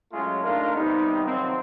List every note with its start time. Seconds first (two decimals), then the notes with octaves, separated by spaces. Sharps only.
0.12 F#3 G#3 A3 C#4 F4
0.42 A3 A#3 D4 D#4 F4 A#4
0.73 C3 G3 B3 D#4
1.23 C3 D#3 F3 F#3 C4